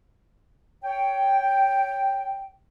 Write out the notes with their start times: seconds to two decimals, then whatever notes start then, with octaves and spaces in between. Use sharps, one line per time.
0.83 C#5 G5